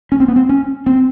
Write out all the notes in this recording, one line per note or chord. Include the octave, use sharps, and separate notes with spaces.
C#4
C4
B3
C4
C#4
C4